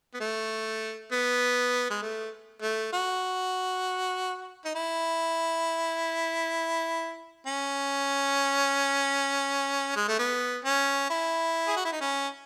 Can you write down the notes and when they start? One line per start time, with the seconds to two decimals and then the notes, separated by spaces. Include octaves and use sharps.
0.14 B3
0.20 A3
1.12 B3
1.90 G#3
2.02 A3
2.62 A3
2.93 F#4
4.64 D#4
4.75 E4
7.47 C#4
9.96 G#3
10.08 A3
10.19 B3
10.65 C#4
11.10 E4
11.68 G#4
11.76 F#4
11.85 E4
11.92 D#4
12.01 C#4